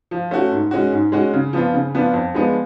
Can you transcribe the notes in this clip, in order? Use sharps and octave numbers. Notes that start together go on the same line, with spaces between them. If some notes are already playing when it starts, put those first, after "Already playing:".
F3
A3 C#4 F#4
G#2
G#3 C#4 F#4
G#2
G#3 C#4 F#4
C#3
F3 B3 D4 F4
C#3
F3 B3 D4 F4
F2
F3 G#3 B3 D4